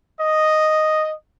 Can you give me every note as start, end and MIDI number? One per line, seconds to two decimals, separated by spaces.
0.21 1.15 75